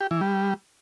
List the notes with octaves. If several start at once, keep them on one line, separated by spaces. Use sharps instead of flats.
G4
E3
G3